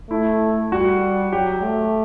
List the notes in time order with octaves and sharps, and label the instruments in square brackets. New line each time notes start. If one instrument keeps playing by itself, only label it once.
[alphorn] A3 [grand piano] E4
[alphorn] G3 [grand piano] F#4
[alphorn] F#3 [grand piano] G4
[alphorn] A3